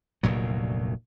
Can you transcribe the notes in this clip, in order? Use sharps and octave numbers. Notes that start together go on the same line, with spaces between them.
F1 D2 A#2 F#3